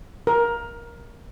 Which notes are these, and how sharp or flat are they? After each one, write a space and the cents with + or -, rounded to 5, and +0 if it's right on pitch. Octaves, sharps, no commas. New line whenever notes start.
A#4 +15